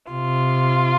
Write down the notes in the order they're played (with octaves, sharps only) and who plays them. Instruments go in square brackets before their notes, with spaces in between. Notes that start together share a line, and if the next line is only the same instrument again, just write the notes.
[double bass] C3 [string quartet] F4